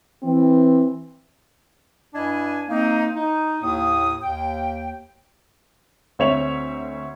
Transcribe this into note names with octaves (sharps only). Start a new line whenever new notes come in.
E3 C4
G2 D4 E4 D#5 G#5
A#3 C4 D#4
D#4
D#2 A2 A#3 D#6
D#2 G5
D2 C4 C#5 E5 C#6 F7